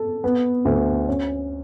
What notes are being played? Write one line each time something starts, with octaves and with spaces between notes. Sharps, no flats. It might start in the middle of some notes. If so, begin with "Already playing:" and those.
Already playing: A4
B3
D2
C#4